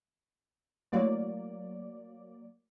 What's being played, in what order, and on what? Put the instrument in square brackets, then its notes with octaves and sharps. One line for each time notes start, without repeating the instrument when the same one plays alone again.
[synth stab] F#3 A#3 D5 [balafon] A3 E4 C#5